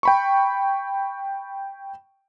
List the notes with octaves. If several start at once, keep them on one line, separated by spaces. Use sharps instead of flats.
G5 B5 C#6